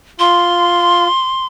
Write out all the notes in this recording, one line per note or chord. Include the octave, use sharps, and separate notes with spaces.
F4 C6